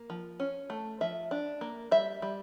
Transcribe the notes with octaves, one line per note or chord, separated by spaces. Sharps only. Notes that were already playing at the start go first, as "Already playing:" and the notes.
Already playing: A#3
F3
C#4
A3
F3 E5
D4
A#3
G3 E5
G3